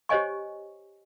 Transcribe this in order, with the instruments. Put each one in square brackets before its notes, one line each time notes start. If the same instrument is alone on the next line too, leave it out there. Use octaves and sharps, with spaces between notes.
[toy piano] G4 C5 C#5 D#5 G#5 C#6